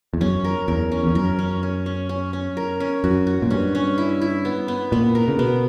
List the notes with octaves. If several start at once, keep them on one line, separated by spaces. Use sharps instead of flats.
E2
F#2 C#4
A#4
E2 A#4
C#4
E2
F#2 A#4
C#4
C#4
C#4
C#4
C#4
A#4
C#4
F#2 F#4
F#4
A#2
G2 C#4
C#4
E4
E4
B3
B3
A#2 B3
A#4
C#3
B2 B3